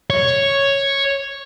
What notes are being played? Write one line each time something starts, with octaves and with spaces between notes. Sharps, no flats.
C#5